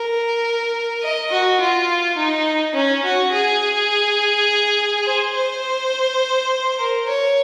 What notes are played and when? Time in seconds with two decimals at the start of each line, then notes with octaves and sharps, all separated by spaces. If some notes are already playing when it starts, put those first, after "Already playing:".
Already playing: A#4
1.03 D#5
1.30 F#4
1.60 F4
2.17 D#4
2.75 C#4
3.04 F#4
3.32 G#4
5.05 C5
5.34 C5
6.78 A#4
7.08 C#5